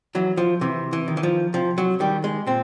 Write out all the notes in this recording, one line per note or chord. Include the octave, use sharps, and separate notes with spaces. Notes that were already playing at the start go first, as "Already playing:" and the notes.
E3 F#3
F3
C3 E3
E3
D#3
E3
F3
C3 F3
F#3
D#3 G3
G#3
A#2 C4